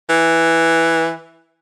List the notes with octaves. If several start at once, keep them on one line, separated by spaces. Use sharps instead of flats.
E3